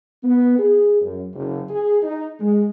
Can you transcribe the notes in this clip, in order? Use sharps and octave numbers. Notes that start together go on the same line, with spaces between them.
B3
G#4
F#2
F#1
G#4
D#4
G#3